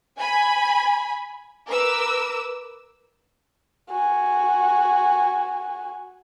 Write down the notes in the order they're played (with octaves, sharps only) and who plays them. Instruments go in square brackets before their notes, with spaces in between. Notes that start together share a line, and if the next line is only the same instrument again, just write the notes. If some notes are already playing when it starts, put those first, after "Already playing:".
[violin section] G#5 B5
A#4 B4 D6 E6
[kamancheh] F#4 G#5